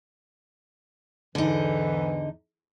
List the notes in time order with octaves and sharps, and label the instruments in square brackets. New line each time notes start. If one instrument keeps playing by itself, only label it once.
[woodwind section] E2 G#2 E3 [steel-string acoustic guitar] D3 D#4